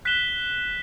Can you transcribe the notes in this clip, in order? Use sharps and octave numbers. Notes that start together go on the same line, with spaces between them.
F#6 B6 E7 G7